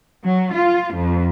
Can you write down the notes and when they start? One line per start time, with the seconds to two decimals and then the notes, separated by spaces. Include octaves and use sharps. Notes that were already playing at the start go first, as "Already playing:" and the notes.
0.23 F#3
0.53 F4
0.94 F2